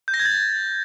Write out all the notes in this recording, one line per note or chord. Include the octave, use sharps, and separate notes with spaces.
G6
A#6
G#6
A6